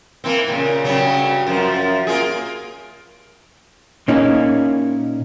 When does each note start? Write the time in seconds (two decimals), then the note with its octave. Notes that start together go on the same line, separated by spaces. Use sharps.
0.24 E3 A#3 C4
0.48 A#2 C#3
0.84 G2 C#3 F#3
1.47 F#2 F3
2.07 A#3 F4 G#4
4.08 A#2 A#3 C#4 D#4 E4 G#4